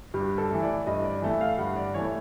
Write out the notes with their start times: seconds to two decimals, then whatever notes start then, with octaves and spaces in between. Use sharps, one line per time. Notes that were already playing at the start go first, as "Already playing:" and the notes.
0.14 G2 G4
0.38 A4
0.51 E3 A3
0.63 D5
0.87 G2 D#5
1.04 D5
1.22 E3 A3
1.41 F5
1.58 G2 F#5
1.77 D5
1.94 E3 A3 C#5